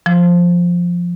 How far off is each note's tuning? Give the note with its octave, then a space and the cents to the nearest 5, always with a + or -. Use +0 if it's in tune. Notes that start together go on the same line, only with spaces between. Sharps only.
F3 +5